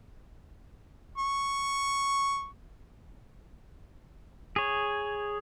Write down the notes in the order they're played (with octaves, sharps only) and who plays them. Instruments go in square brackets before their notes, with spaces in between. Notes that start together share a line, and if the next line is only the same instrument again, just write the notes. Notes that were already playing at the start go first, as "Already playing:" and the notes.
[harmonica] C#6
[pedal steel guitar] G#4 C#5